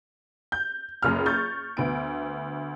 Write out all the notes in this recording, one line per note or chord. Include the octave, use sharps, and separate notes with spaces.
G6
F#1 C#2 F6
C#6 G6 A6
D2 B3 D7